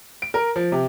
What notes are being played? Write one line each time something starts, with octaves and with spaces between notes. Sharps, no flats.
D7
A#4
F3
C3